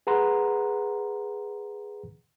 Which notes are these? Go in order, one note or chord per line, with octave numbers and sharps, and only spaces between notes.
G#4 B4 F#5 A#5 C6